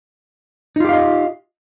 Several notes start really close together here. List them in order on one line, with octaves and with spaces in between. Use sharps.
D#4 F4 G4 F5 D#5